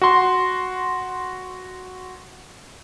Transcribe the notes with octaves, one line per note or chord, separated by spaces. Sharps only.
F#4 C6